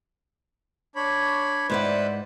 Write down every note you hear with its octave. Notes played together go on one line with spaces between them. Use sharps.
D4 C#5 B5
G#2 E4 B4 C5 D5 F#5